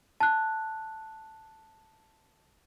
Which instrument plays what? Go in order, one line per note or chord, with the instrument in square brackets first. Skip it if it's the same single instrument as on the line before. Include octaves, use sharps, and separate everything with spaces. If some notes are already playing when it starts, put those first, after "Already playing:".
[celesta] A5 F#6